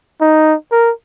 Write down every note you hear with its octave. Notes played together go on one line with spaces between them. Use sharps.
D#4
A#4